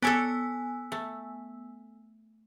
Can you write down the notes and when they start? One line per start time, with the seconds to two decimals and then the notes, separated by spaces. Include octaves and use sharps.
0.02 B3 A4 C#5 D5 G#5 E6
0.92 A3